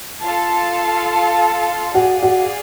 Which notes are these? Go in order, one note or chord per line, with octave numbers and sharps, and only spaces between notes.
F4 A4 F5 A5
F#4 G#4 D5 F5
F#4